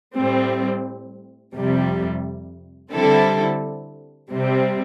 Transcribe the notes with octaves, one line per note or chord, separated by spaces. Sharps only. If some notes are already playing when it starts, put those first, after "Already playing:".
A2 G3 C4
F2 C3 G3
D3 G3 C4 E4 A4
C3 G3 C4